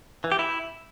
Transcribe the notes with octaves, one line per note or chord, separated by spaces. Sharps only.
E3
G4
E4